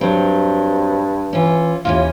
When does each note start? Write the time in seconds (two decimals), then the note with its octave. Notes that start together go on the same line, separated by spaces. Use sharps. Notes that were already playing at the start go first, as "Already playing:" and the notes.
0.01 G2 F#3 C4
1.33 E3 C#4 F4
1.85 D#2 C3 E3 C#4 F4